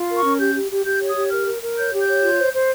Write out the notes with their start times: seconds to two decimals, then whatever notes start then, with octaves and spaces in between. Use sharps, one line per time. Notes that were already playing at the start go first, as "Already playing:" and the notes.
Already playing: F4
0.09 A#4
0.16 C#6
0.24 C#4
0.39 G4 G6
0.54 G4
0.70 G4
0.85 G4 G6
1.00 C#5
1.09 D#6
1.16 G4
1.31 A#4 F6
1.46 A#4
1.61 A#4
1.76 C#5 G6
1.92 G4
2.00 G6
2.07 C#5
2.22 F4
2.38 C5
2.52 C5